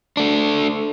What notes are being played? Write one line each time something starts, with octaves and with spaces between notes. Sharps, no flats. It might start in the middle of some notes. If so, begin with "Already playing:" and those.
A3 D4